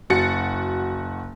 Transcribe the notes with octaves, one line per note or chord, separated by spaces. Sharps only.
F#1 F#4 A6 C#7